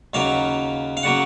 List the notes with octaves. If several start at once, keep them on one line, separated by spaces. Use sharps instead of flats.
D#2 C#3 F#3 A#3 F5
F5
C#3 F#3 A#3 F#5